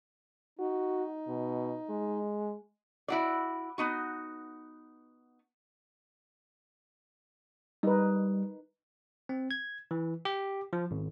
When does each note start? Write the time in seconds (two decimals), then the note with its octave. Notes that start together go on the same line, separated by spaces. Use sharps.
0.59 D#4 F#4
1.28 B2
1.90 G#3
3.08 E4 F#4 D5
3.78 B3 D#4 F#4
7.83 G3 D#4 B4
9.29 C4
9.51 G#6
9.91 E3
10.25 G4
10.73 F3
10.91 G#1